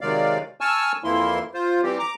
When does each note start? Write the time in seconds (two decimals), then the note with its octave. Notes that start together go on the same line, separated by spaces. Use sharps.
0.01 C3 D#3 F#3 G#3 D5 F5
0.61 G#5 A5 C#6 E6 F6
1.04 F2 E3 A#3 E4 C6
1.54 F4 C5
1.83 E3 G3 C4 G4
1.99 A#5 D6